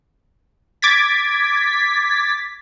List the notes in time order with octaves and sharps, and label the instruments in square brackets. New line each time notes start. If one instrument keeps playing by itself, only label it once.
[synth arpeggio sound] D6 G#6 A6 B6